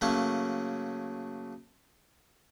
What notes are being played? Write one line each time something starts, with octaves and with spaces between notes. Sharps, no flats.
C#3 F#3 A3 A#3 C#4 C#6